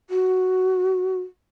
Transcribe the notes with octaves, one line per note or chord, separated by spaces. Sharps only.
F#4